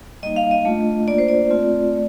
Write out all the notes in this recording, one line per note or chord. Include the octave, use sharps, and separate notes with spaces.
G3 A#3 D#4 D#5
F5
D#5
A3 D4 F4
A#3 D4 F4 D5
C5
D5
A3 C4 F4
A3